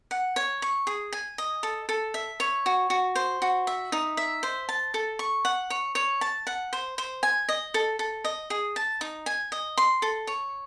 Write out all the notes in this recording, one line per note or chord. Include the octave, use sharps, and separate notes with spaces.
F#5
C#5
C#6
G#4
G#5
D#5
A4
A4
E5
C#5
F#4
F#4
C5
F#4
E5
D#4
E5
C5
A5
A4
C#6
F#5
C#5
C#5
A5
F#5
C5
C5
G#5
D#5
A4
A4
D#5
G#4
A5
D#4
G#5
D#5
C6
A4
C#5